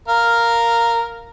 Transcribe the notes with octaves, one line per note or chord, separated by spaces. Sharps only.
A#4 F5